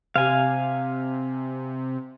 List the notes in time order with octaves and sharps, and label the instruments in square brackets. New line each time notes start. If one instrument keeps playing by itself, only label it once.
[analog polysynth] C3 [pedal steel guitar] F5 G#5